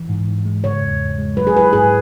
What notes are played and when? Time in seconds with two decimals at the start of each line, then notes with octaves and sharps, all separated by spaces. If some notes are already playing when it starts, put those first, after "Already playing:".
Already playing: E3
0.09 G#2
0.28 G#2
0.45 G#3
0.64 C#3 C#5
0.82 E2
1.00 E2
1.19 G#3
1.37 F#3 B4
1.47 G#4
1.55 E4 B4
1.73 G#2 G#4